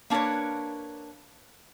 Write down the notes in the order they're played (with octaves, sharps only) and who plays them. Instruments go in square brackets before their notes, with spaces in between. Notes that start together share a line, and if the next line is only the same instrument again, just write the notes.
[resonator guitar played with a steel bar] A#3 D4 A#4 B4 C#5